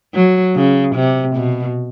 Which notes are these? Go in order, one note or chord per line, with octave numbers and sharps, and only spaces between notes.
F#3
C#3
C3
B2